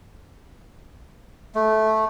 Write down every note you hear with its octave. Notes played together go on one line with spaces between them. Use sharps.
A3